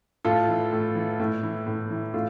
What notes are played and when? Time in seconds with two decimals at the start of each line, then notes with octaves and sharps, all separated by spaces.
0.25 A2 F4 A4
0.48 E3
0.72 A2
0.95 E3
1.20 A2
1.43 E3
1.67 A2
1.90 E3
2.14 A2 F4